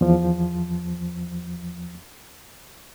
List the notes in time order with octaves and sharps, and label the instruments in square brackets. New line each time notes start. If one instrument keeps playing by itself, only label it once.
[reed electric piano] E2 F3